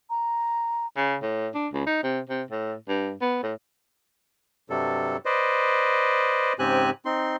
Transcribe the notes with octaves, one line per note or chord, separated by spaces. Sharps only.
A#5
C#3
A2
D4
C#2
D#4
C3
C3
A2
G2
B3
A2
G2 C3 F#3 G3 A4
B4 C5 D5 D#5
G#2 C#3 C4 G4 G#5 F#6
C4 D#4 C6